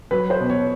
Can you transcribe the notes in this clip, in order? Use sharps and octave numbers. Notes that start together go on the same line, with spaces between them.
F#3 B4
C5
B2
C#5